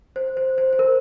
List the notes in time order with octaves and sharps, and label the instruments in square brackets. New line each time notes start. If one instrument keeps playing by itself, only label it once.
[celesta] C5
C5
C5
C5
A#4